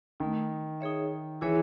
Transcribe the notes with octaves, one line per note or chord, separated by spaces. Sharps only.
D#3 A3 C4 D#4
D#4 G#4 C#5 E5
E3 E4 G#4 C#5 E5